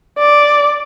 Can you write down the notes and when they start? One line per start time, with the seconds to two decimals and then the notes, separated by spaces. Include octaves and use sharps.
0.19 D5